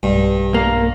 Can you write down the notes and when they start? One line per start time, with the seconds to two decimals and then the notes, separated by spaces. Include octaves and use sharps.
0.03 B1 G2
0.54 A#3